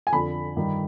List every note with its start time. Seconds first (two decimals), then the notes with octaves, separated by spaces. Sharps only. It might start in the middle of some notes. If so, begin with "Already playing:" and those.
0.07 G#5
0.12 F2 D3 B5
0.57 G2 D#3